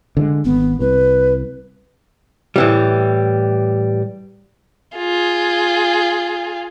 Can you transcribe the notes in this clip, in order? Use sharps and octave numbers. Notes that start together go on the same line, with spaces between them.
D3 E3 G#3
G#1 B3
C2 B4
A2 E3 G3
F4 G#4